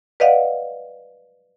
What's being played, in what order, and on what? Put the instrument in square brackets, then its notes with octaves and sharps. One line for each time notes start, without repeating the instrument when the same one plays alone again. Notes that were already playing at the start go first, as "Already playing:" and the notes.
[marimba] B4 D5 D#5 F5 F#5